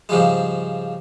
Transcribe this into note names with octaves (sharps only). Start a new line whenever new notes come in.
G#2 C#3 F3 G3 G#3